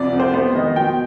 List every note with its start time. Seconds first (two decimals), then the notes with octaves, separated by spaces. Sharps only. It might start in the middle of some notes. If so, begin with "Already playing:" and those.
Already playing: C2 F2 D5
0.13 F2
0.20 C5
0.33 B3 C5
0.55 D#3 D#5
0.76 B2 G5